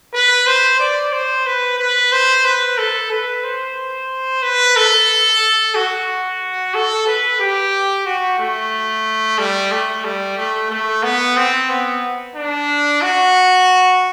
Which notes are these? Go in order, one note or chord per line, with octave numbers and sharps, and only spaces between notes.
B4
C5
D5
C5
B4
B4
C5
B4
A4
B4
C5
B4
A4
F#4
A4
B4
G4
F#4
A3
G3
A3
G3
A3
A3
B3
C4
B3
D4
F#4